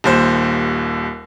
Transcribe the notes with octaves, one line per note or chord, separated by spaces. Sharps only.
D#1 D#2 C5